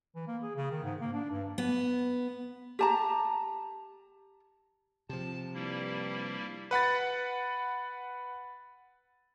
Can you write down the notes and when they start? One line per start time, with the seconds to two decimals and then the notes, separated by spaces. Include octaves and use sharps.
0.15 E3
0.28 A#3
0.43 G#4
0.56 C#3
0.71 D#3
0.83 G#2
1.01 A#3
1.13 D4
1.31 G2
1.58 B3
2.79 G4 A5 A#5
5.09 C3 F3 A5
5.54 G2 G3 A#3 E4
6.71 B4 F#5 B5 A6